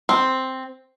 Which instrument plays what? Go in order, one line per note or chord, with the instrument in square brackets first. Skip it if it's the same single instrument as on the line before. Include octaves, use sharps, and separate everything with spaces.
[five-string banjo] C4